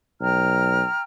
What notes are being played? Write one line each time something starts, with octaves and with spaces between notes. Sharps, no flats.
B1 G5 A#5 F6